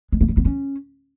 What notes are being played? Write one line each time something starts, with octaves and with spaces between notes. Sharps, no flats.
G#3
A#3
G#3
B3
C#4